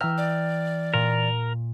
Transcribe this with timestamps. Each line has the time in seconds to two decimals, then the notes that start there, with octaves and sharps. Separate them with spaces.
0.01 E3 E5 G5 A#5 F6
0.18 D5
0.94 A#2 A#4